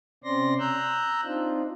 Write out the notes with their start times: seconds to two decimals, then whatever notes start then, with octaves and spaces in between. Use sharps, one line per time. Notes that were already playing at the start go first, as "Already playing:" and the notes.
0.24 C3 C4 C#4 D5 C6 A#6
0.59 A#5 E6 F#6 G6
1.24 C4 D4 D#4 F4